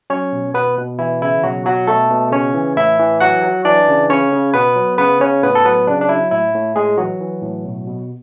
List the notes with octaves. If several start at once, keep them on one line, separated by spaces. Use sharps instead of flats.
F#3 C#4 C#5
B2
B2 B3 B4
B2
E3 E4
C#3 E4
B2 F#3 F#4
B2 F#3 F#4
B2 A3 A4
B2
C#3 C#4 C#5
E3
A2 E4 E5
E3
F#3 F#4 F#5
F#3
E3 D4 D5
C#3
C#3 C#4 C#5
C#3
B2 B3 B4
F#3
C#3 B3 B4
C#3 C#4 C#5
A2 B3 B4
A4
F#3 B3 B4
C#3 D4
D4
F#3 E4
A2 E4
A2
A2 G#3 G#4
E3 F#3 F#4
E3
A2
B2
B2